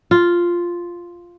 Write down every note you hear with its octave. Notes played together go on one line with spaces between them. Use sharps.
F4